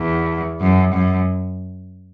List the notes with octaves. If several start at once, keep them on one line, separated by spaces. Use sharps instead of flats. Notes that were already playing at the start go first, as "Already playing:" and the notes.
Already playing: E2
F#2
F#2